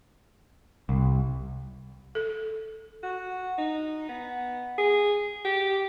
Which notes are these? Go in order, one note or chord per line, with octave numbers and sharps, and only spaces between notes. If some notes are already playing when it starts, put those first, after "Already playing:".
C2
A4
F#4
D#4
B3
G#4
G4